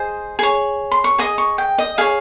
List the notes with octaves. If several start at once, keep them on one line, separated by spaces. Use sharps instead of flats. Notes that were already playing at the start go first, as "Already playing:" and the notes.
Already playing: G#4 C5 D#5
G#4 C#5
C6
C#6
G#4 D#5 D#6
C#6
G5
D#5
G#4 C#5 F5